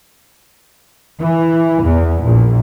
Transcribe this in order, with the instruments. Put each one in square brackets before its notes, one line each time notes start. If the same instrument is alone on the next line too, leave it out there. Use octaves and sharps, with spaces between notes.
[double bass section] E3
E2
A#1